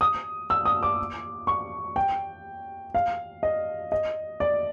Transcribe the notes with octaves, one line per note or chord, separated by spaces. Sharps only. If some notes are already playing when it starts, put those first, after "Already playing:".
D#6
E6
D#6
D6
C#6
G5
F5
D#5
D#5
D5